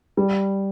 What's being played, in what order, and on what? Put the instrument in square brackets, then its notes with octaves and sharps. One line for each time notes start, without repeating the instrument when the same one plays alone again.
[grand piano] G3